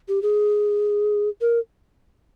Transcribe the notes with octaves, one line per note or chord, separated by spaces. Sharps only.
G4
G#4
A#4